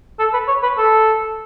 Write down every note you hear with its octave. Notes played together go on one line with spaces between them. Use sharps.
A4
B4
C#5
B4
A4